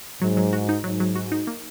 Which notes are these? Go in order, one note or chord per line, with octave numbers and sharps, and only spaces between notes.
G#2 F#3
F#3
F#4
D#4
G#2 F#3
F#3
F#4
D#4
A#3